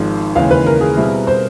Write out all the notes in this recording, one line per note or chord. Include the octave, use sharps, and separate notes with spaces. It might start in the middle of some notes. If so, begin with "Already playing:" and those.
Already playing: G#1 G#2 F3
D#2 C#3 E3 G#3 F5
B4
A#4
G#4
B2 G3 C4 E4
C5